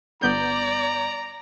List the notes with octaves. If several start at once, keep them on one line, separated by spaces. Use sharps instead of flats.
G1 B3 D5 A#5 G6